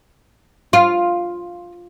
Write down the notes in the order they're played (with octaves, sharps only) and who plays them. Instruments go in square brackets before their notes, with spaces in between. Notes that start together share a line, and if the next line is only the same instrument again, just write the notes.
[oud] F4